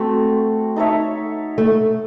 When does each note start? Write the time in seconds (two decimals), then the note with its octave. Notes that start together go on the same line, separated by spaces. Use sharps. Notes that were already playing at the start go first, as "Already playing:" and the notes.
Already playing: A3 C4 F#4 A4
0.76 D#4 A4 C#5 E5
1.58 A3